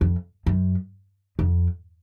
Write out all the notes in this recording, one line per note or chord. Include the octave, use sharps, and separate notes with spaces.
F2
F#2
F2